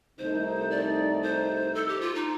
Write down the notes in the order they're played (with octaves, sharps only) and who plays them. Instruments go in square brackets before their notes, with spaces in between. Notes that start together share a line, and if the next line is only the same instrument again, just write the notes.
[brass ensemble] C2 C3 D#3 A3 D#4 [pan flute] C5
[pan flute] D5
C5
A4
G4
F4
D#4